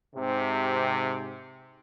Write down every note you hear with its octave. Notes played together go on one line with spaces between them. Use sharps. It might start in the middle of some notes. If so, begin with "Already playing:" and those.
G#2 C3